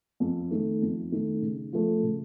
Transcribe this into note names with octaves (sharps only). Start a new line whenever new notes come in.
F2
D#3 A3 D#4
F2
D#3 A3 D#4
C#3
F3 A3
C#3